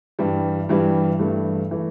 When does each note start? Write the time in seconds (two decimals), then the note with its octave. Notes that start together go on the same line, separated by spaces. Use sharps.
0.19 G2 E3 G3
0.69 G2 E3 G3
1.19 G2 E3 A3
1.71 E3 A3